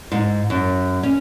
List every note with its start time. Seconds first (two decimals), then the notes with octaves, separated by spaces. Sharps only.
0.12 G#2
0.50 F#2
1.03 C#4